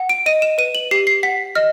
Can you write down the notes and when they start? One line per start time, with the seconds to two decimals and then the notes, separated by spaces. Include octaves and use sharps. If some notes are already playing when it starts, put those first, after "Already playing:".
Already playing: F#5
0.09 D7
0.26 D#5 D#7
0.42 E7
0.58 B4 D#7
0.75 F#7
0.91 G4 C7
1.07 C7
1.23 F#5 B6
1.55 D#5 F6